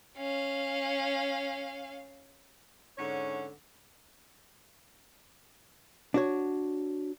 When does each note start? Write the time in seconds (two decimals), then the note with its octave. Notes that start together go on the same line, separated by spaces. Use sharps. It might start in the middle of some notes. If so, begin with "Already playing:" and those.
0.18 C#4 F5
2.98 G#2 D3 C#4 C#5 F#5
6.14 D4 F#4 C#5